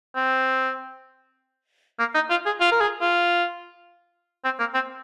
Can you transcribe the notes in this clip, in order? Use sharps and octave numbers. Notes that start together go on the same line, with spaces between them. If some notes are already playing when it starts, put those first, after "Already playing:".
C4
A#3
D#4
F4
G#4
F4
A#4
G#4
F4
C4
A#3
C4